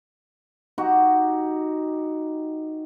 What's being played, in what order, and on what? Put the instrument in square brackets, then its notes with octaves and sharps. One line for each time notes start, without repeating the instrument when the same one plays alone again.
[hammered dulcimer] D#4 F#4 G4